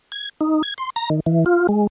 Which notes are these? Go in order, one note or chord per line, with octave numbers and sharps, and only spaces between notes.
G#6
D#4
G#6
C6
A#5
D#3
E3
F4
G#3